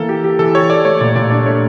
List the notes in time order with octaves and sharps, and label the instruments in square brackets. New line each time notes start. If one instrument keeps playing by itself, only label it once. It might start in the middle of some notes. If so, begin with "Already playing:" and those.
Already playing: [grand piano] E3 A#3 [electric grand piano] A4
[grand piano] G4
G4
[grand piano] E3 [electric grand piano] A4
[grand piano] G4 [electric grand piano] C#5
[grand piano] A4 [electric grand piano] D5
[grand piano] A3 [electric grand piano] C#5
[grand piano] A#2 [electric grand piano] D5
[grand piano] A#2 [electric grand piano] D5
[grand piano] D4 [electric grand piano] D5
[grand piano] A3 [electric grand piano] C#5